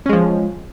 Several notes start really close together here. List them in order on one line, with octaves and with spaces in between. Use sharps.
C#4 G#3 F3